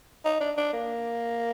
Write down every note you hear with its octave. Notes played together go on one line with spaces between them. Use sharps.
D#4
D4
D4
A#3